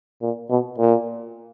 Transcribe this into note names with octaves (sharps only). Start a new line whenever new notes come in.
A#2
B2
A#2